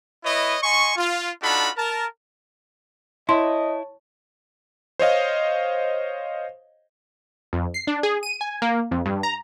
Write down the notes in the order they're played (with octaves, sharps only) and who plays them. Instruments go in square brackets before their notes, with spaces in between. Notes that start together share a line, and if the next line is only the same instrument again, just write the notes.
[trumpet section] E4 B4 C#5 D#5
D#5 G#5 C6 C#6
F4
D4 D#4 F4 F#4 A4 B5
A#4 A5
[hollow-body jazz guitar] E4 [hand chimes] C#5 A5 [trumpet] D#5 [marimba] C6
[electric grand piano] C5 C#5 D#5 F5
[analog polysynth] F2
C7
D4
G#4
D#7
G#5
A#3
F2
G2
A#5